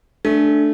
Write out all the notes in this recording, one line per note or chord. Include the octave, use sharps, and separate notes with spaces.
A3 D4